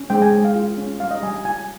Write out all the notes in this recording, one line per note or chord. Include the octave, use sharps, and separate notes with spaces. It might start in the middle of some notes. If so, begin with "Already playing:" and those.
Already playing: C#4
G#3 G5
G#5
G#3
F5
F4
C#4
G3 F5
D#5
G3 G#5
G#5
F4 G#5